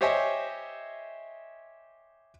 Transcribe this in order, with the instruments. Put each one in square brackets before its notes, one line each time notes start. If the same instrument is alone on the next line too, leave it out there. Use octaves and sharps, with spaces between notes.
[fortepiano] G4 C5 C#5 D#5 E5 G#5